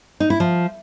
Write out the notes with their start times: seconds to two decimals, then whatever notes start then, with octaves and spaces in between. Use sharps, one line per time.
0.20 D#4
0.30 E4
0.40 F3